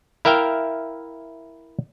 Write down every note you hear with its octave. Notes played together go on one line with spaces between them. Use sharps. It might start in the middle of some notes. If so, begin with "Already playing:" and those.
E4 A#4 E5 F5 G5